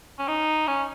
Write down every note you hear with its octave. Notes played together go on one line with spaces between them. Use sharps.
C#4
D#4
C#4